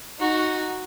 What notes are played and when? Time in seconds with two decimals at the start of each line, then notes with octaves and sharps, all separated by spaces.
0.19 D#4 F#4